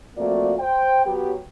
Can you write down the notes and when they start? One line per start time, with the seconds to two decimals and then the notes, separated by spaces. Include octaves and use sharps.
0.18 F3 A3 A#3 C4 F#4 D5
0.59 C5 G5
1.06 F#3 B3 G4